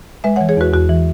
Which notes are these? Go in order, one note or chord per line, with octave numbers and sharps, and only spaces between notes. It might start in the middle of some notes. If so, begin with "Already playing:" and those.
G#3 B4 E5
C#5 F#5
E3
G#4 C#5
E2 F#4 B4
E2 F#4
E3